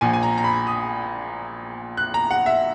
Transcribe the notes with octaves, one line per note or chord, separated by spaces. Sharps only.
A#1 A#2 G#5
G#5
A#5
A#5
B5
D#6
F#6
A#5
F#5
E5